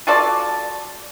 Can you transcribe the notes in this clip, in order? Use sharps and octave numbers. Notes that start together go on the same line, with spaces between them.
F4 F#4 A4 D5